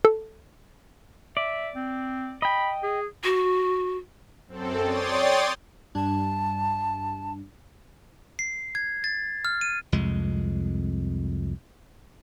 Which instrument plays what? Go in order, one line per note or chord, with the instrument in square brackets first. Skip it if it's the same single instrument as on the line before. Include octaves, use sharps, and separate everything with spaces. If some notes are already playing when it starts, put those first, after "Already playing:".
[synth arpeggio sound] A4
[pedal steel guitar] D5 [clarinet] E5
[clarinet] C4
[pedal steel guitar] D#5 G5 [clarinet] B5
[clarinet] G#4
[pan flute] F#4
[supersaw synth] F#2 C4 A4
C#5 D5 G5 C6 D#6 A6
[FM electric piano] G2 G3 D4 [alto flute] A5
[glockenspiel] C7
G#6
A6
F6
D#7
[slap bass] C2 F2 G#3